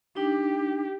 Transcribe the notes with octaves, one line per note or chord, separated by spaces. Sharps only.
D4 D#4 G4